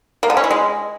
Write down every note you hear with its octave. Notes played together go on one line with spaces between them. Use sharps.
A#3
D3
C#4
E4
G#3